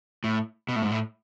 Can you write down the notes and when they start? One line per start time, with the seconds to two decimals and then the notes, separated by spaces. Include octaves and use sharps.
0.24 A2
0.69 B2
0.76 A2
0.82 G#2
0.91 A2